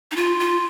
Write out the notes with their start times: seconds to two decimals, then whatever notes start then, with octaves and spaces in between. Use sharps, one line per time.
0.11 D#4
0.16 F4
0.40 F4